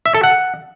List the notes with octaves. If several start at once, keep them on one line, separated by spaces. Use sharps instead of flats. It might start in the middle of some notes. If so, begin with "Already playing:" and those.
E5
A4
F#5